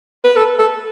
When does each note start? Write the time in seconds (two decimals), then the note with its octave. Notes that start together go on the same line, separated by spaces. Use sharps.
0.24 B4
0.36 A4
0.59 A4